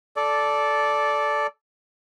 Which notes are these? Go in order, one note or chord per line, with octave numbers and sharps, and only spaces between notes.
A4 D5